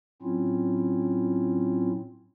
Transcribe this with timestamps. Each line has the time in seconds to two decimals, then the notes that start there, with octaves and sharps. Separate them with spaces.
0.22 A2 F#3 C4 C#4 E4 F4